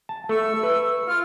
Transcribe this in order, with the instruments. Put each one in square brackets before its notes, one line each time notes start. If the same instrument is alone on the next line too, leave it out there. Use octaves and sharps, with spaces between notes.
[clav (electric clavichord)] A5
[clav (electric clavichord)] A3 [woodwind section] E4 C#6 E6
[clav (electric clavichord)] B4
[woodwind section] F4 F6